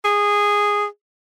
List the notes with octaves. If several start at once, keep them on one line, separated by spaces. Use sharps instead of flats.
G#4